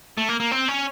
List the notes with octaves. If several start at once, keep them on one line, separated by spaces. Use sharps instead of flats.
A3
A#3
A#3
C4
C#4